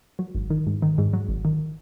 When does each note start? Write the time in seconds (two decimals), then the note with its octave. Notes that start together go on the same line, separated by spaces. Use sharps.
0.19 F#3
0.35 G#1
0.50 D#3
0.66 G#2
0.82 D#3
0.98 G#2
1.13 F#3
1.28 G#1
1.45 D#3